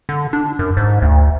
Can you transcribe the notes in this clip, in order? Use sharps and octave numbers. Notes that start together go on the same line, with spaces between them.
D3
D4
F#2
G#2
D2